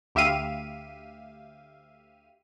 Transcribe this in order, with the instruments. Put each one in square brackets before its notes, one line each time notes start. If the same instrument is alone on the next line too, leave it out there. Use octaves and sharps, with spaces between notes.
[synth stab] D2 G4 E5 F5 D#7